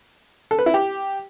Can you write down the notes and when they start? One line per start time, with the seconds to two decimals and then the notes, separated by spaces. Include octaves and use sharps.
0.51 A4
0.59 B4
0.66 E4
0.74 G4